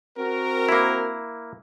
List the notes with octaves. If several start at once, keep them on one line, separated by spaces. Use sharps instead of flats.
C4 F#4 A#4
A#3 E4